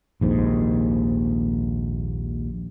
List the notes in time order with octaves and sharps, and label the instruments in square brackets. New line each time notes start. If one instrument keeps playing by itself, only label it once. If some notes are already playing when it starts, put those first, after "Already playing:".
[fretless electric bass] A#1 D#2 G#2